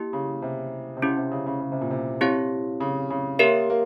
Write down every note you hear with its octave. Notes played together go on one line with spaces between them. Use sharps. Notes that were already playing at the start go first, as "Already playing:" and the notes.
Already playing: A#3 E4 G4
C#3
C3
C3
C#3 C#4 E4 G4
C3
C#3
C#3
C#3
C3
A#2
C3
C4 E4 G4 C#5 F5
C#3
C#3
A#3 G4 A#4 C#5 E5
A#3